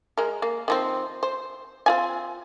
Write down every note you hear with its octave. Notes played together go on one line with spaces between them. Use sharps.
G#3 A#4
A#3
D#3 F3 C4
C5
C4 F4 G#5